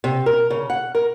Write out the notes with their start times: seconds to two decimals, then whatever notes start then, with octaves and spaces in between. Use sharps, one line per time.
0.04 C3
0.26 A#4
0.50 C#3
0.70 F#5
0.95 A#4